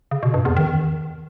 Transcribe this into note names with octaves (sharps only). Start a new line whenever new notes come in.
C#3
B2
G2
E2
D#3